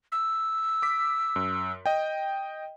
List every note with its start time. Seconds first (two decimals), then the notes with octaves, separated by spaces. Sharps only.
0.12 E6
0.82 D6 B6
1.36 F#2
1.86 D#5 G5